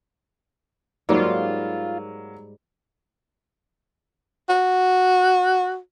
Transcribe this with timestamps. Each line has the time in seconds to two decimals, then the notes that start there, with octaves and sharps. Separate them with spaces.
1.09 G#2 F#3 G3 A#3 F4
4.49 F#4